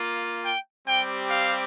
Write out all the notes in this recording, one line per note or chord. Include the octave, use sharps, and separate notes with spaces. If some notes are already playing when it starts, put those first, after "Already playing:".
Already playing: A#3 F4
G5
G3 C4 G4 G5
F5